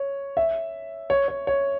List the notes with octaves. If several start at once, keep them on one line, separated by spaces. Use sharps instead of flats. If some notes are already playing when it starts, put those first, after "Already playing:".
Already playing: C#5
E5
C#5
C#5
C#5